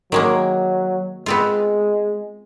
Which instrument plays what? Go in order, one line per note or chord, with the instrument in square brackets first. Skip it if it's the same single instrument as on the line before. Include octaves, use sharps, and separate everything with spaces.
[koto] D#3 G#3 A#3 [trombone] F#3
[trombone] G#3 [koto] B3 C4 F4